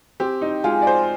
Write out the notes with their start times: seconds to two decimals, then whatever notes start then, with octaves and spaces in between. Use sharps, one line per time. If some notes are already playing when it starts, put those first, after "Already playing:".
0.20 C4 G4
0.41 D#4
0.64 G#3 F4
0.82 D5
0.87 C5